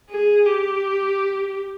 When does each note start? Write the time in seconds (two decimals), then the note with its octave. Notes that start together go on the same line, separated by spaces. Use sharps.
0.10 G#4
0.46 G4